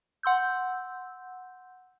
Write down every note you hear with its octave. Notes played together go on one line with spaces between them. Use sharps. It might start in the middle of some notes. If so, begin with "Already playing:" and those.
F#5 C6 E6 G6